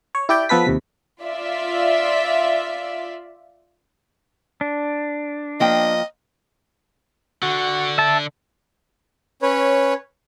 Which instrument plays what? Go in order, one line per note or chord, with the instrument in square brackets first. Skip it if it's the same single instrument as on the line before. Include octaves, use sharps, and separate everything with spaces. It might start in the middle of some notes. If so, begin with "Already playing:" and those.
[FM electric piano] C#5
E4 G4 D5 G5
F3 B3 A4 B4 B6
D#2 C3
[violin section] F4 D5 E5
[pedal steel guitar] D4
[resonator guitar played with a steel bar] F3 A#3 G5 [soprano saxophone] D#5
[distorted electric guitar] D3 [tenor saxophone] F#4
[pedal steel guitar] E5 A5
[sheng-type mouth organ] C#4 B4 C#5